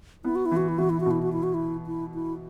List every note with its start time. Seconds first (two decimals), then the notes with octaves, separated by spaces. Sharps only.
0.24 B3 E4
0.35 F#4
0.46 E4
0.52 E3 F#4
0.68 E4
0.78 E3 F#4
0.90 E4
1.00 F#4
1.06 B2 E4
1.22 F#4
1.33 E4
1.43 F#4
1.54 E4
1.86 E4
2.14 E4